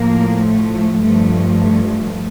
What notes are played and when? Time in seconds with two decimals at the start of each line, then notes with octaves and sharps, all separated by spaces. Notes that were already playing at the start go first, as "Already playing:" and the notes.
Already playing: A2 F3 A#3
0.46 A3
1.02 G2 F3 A3
1.61 A3
1.89 A3